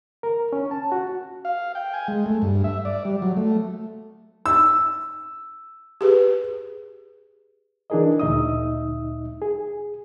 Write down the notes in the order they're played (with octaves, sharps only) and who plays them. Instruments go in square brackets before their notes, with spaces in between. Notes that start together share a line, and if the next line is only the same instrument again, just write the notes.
[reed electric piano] A#4
C#4
A5
F#4
[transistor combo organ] F5
G5
G#5
G#3
A3
G2
E5
D5
G3
F#3
A3
[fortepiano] E6
[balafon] G4 G#4 B4
[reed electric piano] E3 D4 D#4 G#4 A#4 D#5
D2 A#2 D#4 D#5 E5 D#6
G#4